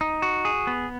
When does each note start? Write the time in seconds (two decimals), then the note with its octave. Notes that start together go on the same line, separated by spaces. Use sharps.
0.01 D#4
0.22 F#4
0.45 G#4
0.67 B3